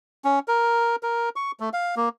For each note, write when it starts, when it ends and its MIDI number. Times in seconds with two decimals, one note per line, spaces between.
0.25 0.39 61
0.48 0.96 70
1.03 1.29 70
1.36 1.52 85
1.60 1.69 57
1.73 1.95 77
1.97 2.09 58